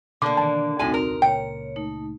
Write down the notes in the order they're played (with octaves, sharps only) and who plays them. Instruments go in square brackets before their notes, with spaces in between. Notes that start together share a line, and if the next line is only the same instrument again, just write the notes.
[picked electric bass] B2 [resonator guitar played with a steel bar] D3 A#3 [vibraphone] D5 [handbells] D6
[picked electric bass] B2 D#3 E3 [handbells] A5
[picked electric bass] D#1 C2 [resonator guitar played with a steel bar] A2 D3 G#5 [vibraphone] C4 D#4 F#4
[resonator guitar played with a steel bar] A#4
[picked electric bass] C#2 A#2 [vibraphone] C#5 [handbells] G5
[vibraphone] A3 D#4